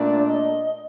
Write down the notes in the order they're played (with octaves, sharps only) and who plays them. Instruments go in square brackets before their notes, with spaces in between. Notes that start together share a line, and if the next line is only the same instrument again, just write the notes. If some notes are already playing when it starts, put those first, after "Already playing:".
Already playing: [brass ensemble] A#2 A3 D4 [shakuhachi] D5
[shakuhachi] D#5